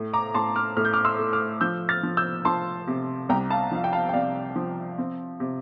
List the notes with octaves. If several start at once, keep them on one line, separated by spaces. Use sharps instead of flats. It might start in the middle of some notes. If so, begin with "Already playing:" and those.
Already playing: A2
A#5 D6
A2 A5 C6
D6 F6
A2 F6
G6
D6 F6
C6 E6
A3
D6 F6
F3 E6 G6
F6 A6
F3
E6 G6
F3 A5 C6
C3
C2 G5 A#5
F5 A5
F3 F5
G5
F5 A5
G5
C3 D5 F5
F3
C4
C3